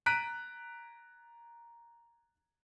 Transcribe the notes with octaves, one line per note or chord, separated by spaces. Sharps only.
A#5 F#6 B6 D7 D#7